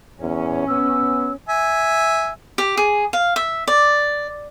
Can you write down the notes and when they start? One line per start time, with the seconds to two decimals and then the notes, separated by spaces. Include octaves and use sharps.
0.20 E2 C#4
0.68 B3 E6
1.49 E5 G#5
2.58 G4
2.77 G#4
3.13 F5
3.36 E5
3.67 D5